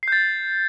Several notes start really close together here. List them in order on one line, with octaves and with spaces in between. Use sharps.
C7 G6 A6